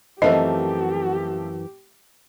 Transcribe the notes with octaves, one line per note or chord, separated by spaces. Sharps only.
F#2 E3 F3 A3 C4 G4 A#4 D#5